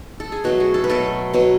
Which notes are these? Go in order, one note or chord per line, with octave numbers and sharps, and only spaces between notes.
A4
G#4
B2 F#3 A3 F#4
G#4
A4
B4
B2 F#3 A3 A4
B2 F#3 B3